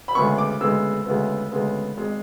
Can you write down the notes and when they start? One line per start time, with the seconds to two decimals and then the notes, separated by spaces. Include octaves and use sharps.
0.08 B5
0.15 D2 C#3 G#3 B3 C#6
0.38 D6
0.61 D2 C#3 G#3 B3 E6
1.06 D2 C#3 G#3 B3
1.52 D2 C#3 G#3 B3
1.97 G#1 G#3